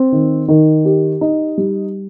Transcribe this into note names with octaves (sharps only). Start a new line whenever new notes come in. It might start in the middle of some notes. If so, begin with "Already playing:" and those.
Already playing: C4
D#3
D#3
G4
D#4
G3